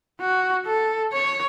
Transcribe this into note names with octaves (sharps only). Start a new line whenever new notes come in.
F#4
A4
C#5